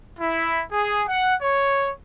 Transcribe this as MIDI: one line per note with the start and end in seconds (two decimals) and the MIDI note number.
0.18 0.61 64
0.71 1.02 68
1.08 1.35 78
1.40 1.89 73